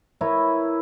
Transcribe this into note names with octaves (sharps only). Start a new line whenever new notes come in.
E4 A#4 B4 C#5